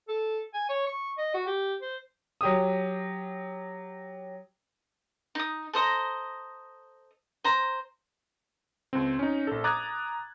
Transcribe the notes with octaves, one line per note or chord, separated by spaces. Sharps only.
A4
G#5
C#5
C#6
D#5
F#4
G4
C5
F#3 G4 D#6
D#4 D#6
A4 C5 D#5 A#5
C5 A#5
C#2 C4
C#4 D#4
A#1 A4
A#5 D6 D#6 F#6 G#6 A6